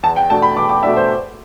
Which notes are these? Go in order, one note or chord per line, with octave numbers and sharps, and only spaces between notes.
E2 A5
G5
B2 A3 D4 A5
B5
E2 D6
D6
B2 A3 D4 E5
C5